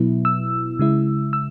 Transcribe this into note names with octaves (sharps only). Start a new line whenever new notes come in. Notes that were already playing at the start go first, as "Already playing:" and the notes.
Already playing: B2 F#3 B3 E4
E6
C#3 G#3 E4
E6